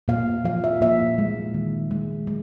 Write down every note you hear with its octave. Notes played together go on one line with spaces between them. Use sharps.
A#2 F5
F3 F5
E5
A#2 E5
G#3
D#3
G#3
G#3